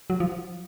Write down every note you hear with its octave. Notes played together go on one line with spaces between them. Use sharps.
F#3
F3